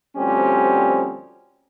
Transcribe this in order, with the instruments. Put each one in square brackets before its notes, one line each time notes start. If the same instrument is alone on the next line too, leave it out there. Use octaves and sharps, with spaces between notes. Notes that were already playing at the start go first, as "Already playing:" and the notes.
[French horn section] D2 F3 G3 C4 C#4 G4